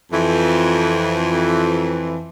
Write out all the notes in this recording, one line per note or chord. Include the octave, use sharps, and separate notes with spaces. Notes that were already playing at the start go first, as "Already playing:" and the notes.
F2 E3